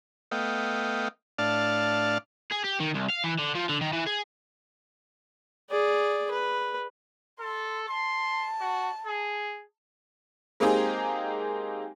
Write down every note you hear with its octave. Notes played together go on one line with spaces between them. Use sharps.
A3 B3 D#5 F5 G5
A2 D4 D5 F5 A5 F6
G#4
G4
D#3
C2
F5
E3
D3
F3
D3
D#3
E3
G#4
G#4 D5
B4
A4 C6
A5 C6
F#4
G#4
G#3 A#3 C4 D#4 G4 G#4